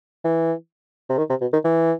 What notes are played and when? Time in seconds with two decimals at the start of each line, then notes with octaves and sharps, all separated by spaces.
0.25 E3
1.10 C3
1.18 D#3
1.30 C3
1.41 B2
1.53 D#3
1.64 E3